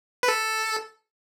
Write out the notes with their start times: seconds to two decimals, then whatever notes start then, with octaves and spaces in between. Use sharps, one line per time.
0.23 B4
0.28 A4